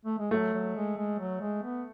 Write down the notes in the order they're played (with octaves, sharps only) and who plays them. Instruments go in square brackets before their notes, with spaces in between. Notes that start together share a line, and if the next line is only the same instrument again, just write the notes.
[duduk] A3
G#3
[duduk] F#3 [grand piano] A3
[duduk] F#3
G#3
G#3
F#3
G#3
B3